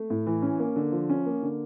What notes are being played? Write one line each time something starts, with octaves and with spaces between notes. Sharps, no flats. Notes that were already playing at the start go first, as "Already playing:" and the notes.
Already playing: A3
A2
E3
C#4
A#3
D3
F3
C#4
A#3
D3